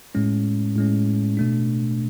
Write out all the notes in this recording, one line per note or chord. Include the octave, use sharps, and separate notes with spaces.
A2 G#3 C#4
A2 G#3 C#4
B2 A3 D4